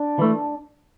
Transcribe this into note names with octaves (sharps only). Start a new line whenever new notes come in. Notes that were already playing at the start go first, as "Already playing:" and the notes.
Already playing: D4
E3 A3